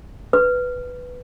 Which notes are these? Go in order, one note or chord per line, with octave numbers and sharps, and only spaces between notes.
B4